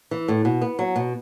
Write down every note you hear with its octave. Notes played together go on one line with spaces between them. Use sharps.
E3
A2
B2
B3
F#3
B2